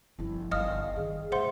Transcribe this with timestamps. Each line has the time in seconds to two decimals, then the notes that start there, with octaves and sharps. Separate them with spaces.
0.19 G1 F3 E4
0.51 G1 D#4 D#5 F5 D#6 F6
0.96 G2 D#3 G#4
1.32 D1 C5 E5 F#5 C6